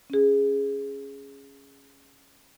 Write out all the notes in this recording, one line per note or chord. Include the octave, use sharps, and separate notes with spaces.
C#4 G#4